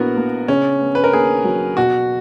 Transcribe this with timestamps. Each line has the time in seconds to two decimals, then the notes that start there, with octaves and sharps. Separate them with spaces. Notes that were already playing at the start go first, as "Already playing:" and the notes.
Already playing: A#1 B3 E4 F#4 A#4
0.16 A#3
0.48 C#3 C#4
0.81 B3
0.95 B4
1.04 A#4
1.13 D#2 G#4
1.45 F#3
1.77 B2 F#4